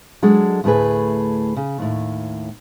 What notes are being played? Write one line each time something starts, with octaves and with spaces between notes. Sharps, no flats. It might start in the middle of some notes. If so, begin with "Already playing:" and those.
F#3 G#3 D4 A4
D2 A2 A3 G#4 B4
C#3
D#2 A2